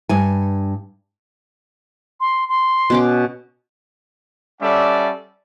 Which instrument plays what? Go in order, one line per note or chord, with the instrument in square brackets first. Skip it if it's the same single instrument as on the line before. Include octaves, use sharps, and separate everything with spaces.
[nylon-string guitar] G2 G#5
[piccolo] C6
C6
[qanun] B2 C#4 D6
[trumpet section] G3 C#4 A4 D5 E5 F#5